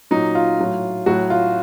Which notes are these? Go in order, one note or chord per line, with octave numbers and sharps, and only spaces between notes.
A#2 F#3 D#4
F4
A2 F#3
A2 F#3 F#4
F4